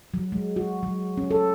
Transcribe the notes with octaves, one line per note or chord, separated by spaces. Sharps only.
F#3
G#3
F#4
F#3
C#4
A4